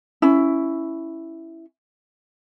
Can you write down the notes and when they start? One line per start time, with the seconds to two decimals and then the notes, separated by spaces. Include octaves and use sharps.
0.22 C#4 E4